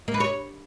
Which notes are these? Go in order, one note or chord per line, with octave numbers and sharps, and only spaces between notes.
A#3
B4
C#5